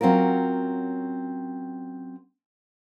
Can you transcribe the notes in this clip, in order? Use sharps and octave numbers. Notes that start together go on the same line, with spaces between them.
F#3 C4 C#4 F4 A#4